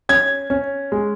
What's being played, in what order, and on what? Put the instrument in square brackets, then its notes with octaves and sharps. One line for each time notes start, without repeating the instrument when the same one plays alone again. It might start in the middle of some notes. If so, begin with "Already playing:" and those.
[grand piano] C#4 G#6
C#4
G#3